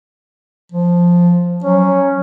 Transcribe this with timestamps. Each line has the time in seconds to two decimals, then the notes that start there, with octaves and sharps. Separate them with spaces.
0.72 F3
1.64 F#3 C#4